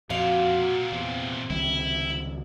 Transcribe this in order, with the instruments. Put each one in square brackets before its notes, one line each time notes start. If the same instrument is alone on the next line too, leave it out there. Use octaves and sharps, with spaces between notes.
[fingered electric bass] F2 [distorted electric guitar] A#2 C4 [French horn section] F#4 [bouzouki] F5
[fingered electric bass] E2 [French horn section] C3
[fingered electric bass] C#2 D#3 G3 [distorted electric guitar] E4